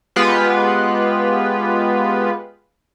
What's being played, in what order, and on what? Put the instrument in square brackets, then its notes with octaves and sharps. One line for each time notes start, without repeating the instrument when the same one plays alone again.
[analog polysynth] G#3 B3 F4 G4 B4